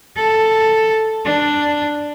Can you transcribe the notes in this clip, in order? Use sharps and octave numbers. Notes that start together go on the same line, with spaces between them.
A4
D4